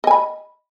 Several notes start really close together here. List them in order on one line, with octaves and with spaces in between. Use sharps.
D#5 G#5 B5